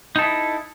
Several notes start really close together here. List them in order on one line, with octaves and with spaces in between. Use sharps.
D#4 A4 E4